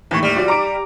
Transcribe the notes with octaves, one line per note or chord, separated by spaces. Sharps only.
D#2 A2 E3 C#6
G3
F3 F#4 D5
A#5 D6 D7